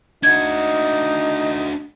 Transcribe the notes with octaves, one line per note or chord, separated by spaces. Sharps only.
D4 D#4 F#4 G#6